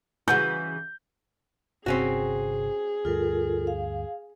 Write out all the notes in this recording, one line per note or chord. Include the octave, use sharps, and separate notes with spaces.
C#3 E3 F#4 G6
G1 C3 C4 C#4 F#4 G#4
D2 G2 F4 A4 A#4
F5